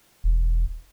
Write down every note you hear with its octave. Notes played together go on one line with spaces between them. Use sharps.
E1